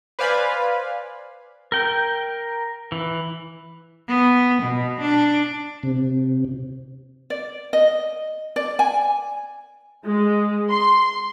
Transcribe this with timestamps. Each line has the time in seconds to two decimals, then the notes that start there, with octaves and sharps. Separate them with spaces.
0.19 B4 C5 D5 F5 G#5 B5
1.72 A#4 G5
2.92 E3
4.08 B3
4.62 B2
5.00 D4
5.83 C3
7.30 D5
7.73 D#5
8.56 D5
8.79 G#5
10.04 G#3
10.70 C6